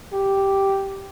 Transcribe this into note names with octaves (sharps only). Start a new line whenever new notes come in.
G4